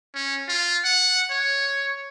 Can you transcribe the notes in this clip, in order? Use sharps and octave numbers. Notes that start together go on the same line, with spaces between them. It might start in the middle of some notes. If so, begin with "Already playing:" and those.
C#4
F4
F#5
C#5